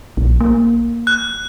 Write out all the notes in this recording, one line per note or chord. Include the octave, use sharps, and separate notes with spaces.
A#1
A#3
F#6